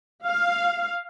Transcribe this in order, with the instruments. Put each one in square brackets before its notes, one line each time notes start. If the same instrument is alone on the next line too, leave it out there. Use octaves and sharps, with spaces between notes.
[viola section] F5